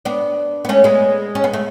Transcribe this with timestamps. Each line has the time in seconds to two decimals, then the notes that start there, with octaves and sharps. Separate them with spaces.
0.05 B3 D4
0.65 B3
0.69 A3 C#4
0.84 G#3 B3
1.35 C#4
1.44 B3
1.53 A3